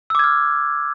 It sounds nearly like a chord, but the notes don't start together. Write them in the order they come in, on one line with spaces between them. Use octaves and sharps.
E6 D6 G#6 F6